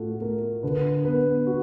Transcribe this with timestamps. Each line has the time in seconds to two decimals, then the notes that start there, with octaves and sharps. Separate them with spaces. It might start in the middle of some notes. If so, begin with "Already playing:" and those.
Already playing: A2 A3 F4 F#4 A4
0.21 A3 A#4
0.63 D3 B4
1.05 B3 B4
1.47 B3 F#4